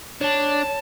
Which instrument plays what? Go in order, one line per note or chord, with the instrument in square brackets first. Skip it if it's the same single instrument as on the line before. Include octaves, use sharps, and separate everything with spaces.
[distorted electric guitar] D4 [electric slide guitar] C#5 [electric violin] A5